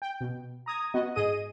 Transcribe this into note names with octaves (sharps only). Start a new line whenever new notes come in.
G5
B2
A#5 D#6 G#6
B3 F#4 D#5
G#2 G#4 D#5 D#7